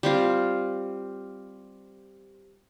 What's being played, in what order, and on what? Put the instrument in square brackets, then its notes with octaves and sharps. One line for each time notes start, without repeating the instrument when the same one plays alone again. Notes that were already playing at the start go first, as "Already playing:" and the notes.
[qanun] G3 C4 F4